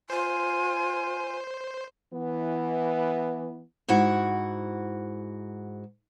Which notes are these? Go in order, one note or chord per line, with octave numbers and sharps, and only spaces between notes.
F4 C5 G#5
E3 B3
G#2 E4 F#4 F#5